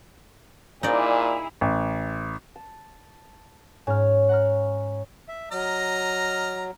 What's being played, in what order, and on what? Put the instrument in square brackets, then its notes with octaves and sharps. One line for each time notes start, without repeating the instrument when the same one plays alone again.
[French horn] A#2 [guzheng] D#4 D5 [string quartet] E4 G#4
[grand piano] A1
[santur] A5
[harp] G#2 F6 [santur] C#4
[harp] F#5 A#5 F6
[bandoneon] E5
[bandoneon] F#3 [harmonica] D#5 A#5 F6